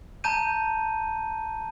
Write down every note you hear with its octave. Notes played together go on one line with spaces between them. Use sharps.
A5 A#5 G6 D#7